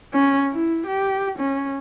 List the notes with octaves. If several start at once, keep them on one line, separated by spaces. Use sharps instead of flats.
C#4
E4
G4
C#4